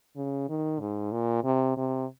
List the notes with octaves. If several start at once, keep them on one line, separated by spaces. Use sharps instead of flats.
C#3
D#3
G#2
A#2
C3
C3